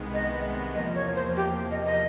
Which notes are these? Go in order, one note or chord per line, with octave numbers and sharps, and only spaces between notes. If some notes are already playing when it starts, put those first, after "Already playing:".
Already playing: C2 C3 D#3 G#3 B3
D#5
E2 C3 F3 A#3 D#5
C#5
C5
G4
D#5
D#5